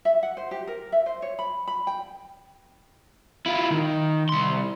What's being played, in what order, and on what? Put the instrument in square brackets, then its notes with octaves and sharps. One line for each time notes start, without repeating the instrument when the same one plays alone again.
[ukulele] E5
F#5
C5
G4
A#4
E5
C5
C#5
B5
B5
G5
[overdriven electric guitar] E4 F4
D#3
C2 C6